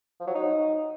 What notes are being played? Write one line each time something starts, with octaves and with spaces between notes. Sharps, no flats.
F3
F#3
D#4